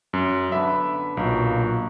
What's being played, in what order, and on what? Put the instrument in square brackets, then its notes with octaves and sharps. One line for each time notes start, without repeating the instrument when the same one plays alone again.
[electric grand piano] F#2
[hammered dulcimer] D3 B3 D5 [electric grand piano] E5
[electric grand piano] B1 [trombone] A#2 [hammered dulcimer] F#4 A#4